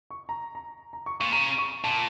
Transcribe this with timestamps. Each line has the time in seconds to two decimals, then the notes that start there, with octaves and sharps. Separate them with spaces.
0.11 C#6
0.29 A#5
0.55 A#5
0.93 A#5
1.06 C#6
1.20 A#2 C#6
1.32 C#3 A#5
1.58 C#6
1.84 A#2 A5